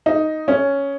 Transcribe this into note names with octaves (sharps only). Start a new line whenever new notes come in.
D#4
C#4